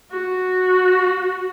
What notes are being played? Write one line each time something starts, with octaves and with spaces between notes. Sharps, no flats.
F#4